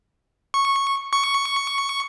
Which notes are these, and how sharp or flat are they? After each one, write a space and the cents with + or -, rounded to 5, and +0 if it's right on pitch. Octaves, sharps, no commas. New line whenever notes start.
C#6 -10
C#6 +5